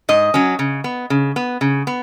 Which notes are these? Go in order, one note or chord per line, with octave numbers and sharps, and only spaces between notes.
G#2 D#5
F#3 C#4
C#3
B3
C#3
B3
C#3
B3